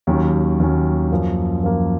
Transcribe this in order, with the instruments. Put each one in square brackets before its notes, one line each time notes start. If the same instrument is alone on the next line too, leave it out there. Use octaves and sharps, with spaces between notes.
[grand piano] D#2 D#3 F#3 C#4
D#2 D#3 F#3 C#4
F#2 F3 A#3
F#2 F3 A#3